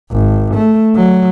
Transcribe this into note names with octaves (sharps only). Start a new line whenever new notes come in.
G#1
A3
F#3